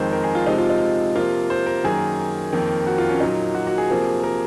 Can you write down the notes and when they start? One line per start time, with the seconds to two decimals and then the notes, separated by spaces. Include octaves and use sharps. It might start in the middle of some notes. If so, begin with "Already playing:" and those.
Already playing: F2 D#3 G#3 C5
0.13 A#4
0.24 G#4
0.35 F4
0.47 C3 F3 G#3 D#4
0.58 F4
0.70 D#4
1.15 C3 F3 A#3 F4
1.50 C5
1.66 A#4
1.84 F#2 D#3 A#3 G#4
2.52 F2 D#3 A#3
2.87 F#4
2.98 F4
3.09 C#4
3.20 A#2 F#3 A#3 D#4
3.55 F#4
3.67 F#4
3.78 G#4
3.90 C3 F3 A#3
4.24 A#4